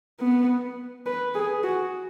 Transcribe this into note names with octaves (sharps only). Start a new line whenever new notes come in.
B3
B4
G#4
F#4